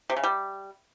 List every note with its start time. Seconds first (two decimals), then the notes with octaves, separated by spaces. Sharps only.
0.10 C3
0.17 C#3
0.24 G3